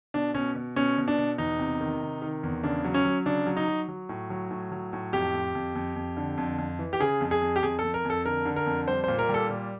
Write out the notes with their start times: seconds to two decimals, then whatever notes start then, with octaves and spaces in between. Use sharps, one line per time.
0.14 B2 D4
0.34 B2 C#4
0.55 B2
0.76 B2 C#4
0.98 B2
1.08 D4
1.18 B2
1.38 E2 D#4
1.59 C3
1.81 D#3
2.02 C3
2.22 D#3
2.43 E2
2.63 C#3 D4
2.84 F#3
2.94 C#4
3.05 F#3
3.26 C#3 D4
3.46 F#3
3.57 D#4
3.68 F#3
3.88 F#3
4.09 A2
4.30 F#3
4.51 A2
4.72 F#3
4.93 A2
5.13 F2 G4
5.34 F2
5.55 F2
5.75 F2
5.96 F2
6.17 D3
6.38 F2
6.58 F2
6.79 E3
6.93 G4
7.00 C#3 G#4
7.21 F2
7.31 G#4
7.41 F2
7.56 G4
7.62 F2 G#4
7.79 F2 A4
7.94 A#4
8.05 F2
8.10 A4
8.25 D3 A#4
8.45 D3
8.56 A#4
8.66 F2
8.87 G3 C5
9.04 A#2 C5
9.19 A#4
9.29 G3
9.34 A4
9.50 A#2